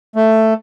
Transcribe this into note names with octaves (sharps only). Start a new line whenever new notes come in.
A3